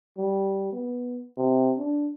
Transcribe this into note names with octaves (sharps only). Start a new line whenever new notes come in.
G3
B3
C3
D4